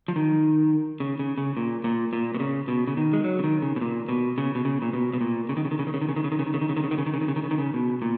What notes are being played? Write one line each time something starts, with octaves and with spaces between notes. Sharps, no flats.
F3
D#3
C#3
C#3
C#3
A#2
A#2
A#2
B2
C#3
B2
C#3
D#3
G#3
F#3
C#3
D#3
C#3
B2
A#2
B2
C#3
B2
C#3
A#2
B2
B2
A#2
C#3
D#3
C#3
D#3
C#3
D#3
C#3
D#3
C#3
D#3
C#3
D#3
C#3
D#3
C#3
D#3
C#3
D#3
C#3
D#3
C#3
D#3
C#3
D#3
C#3
D#3
C#3
D#3
C#3
B2
A#2